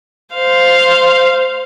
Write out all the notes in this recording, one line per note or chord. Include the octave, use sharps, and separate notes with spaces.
C5 F5